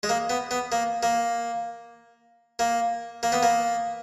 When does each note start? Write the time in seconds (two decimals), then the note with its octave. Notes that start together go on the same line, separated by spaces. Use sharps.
0.03 G#3
0.09 A#3
0.30 B3
0.51 B3
0.72 A#3
1.03 A#3
2.59 A#3
3.23 A#3
3.32 B3
3.43 A#3